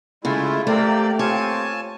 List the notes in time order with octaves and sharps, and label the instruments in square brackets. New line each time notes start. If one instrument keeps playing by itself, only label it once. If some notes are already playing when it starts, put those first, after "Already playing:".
[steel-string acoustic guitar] C#3 [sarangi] G#3 [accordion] A3 E4 F4
[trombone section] C3 A#3 [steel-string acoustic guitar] A3 [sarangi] G4 [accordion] D5
[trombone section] A#3 C4 F4 [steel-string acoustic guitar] C#5 [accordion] G#5 A5